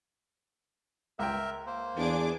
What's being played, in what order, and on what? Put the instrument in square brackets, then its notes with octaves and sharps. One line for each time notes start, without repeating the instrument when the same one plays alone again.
[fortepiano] C#2 G5 [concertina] A#4 E5
[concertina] A#3 C5
[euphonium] E2 [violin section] D4 G#4 D6